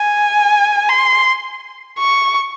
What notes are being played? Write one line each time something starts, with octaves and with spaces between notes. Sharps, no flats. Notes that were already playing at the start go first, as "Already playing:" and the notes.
Already playing: G#5
C6
C#6